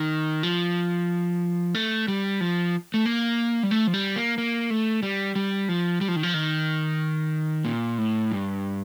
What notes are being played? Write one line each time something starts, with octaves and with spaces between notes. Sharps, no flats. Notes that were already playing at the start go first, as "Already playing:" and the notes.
Already playing: D#3
F3
A3
G3
F3
A3
A#3
G3
A3
F3
G3
A#3
A#3
A3
G3
G3
F3
G3
F3
D#3
F3
D#3
A#2
A2
G2